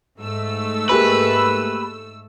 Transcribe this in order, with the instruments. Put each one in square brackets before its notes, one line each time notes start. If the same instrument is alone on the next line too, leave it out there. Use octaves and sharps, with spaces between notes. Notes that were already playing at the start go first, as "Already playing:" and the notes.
[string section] G#2 A3 E6
[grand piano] A#3 G4 G#4 [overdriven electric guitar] B4